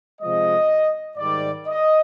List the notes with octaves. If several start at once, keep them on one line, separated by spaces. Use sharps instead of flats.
C3 F3 G#3 D#5
G#2 D#3 G3 D5
D#5